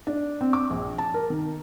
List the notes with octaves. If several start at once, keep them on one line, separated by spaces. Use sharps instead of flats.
D4
C4
D6
A#1
A5
A#4
D#3